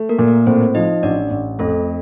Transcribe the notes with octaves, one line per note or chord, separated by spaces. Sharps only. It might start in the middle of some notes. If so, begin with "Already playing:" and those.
Already playing: A3
A#3 A#4
A#2
A#3 A#4
A2 C4 C5
F3 D#4 D#5
A1 D4 D5
A1
F2 A3 A4